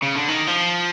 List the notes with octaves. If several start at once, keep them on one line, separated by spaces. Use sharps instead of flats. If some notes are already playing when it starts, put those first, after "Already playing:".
C#3
D3
D#3
F3